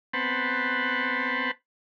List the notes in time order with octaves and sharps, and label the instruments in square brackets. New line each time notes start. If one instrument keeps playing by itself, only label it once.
[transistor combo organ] B3 C4 B4 C5 F#5 A5